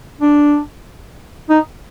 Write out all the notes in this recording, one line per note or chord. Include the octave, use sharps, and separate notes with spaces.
D4
D#4